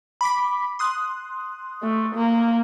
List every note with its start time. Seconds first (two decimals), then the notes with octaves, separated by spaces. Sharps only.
0.21 B5 D6 B6
0.79 C6 D#6 F#6
1.83 A3
2.15 A#3